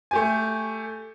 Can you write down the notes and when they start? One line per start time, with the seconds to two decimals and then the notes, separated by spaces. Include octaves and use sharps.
0.11 A3 G4 G#5